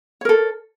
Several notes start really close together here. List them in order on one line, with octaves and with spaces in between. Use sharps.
C#5 A#4 A4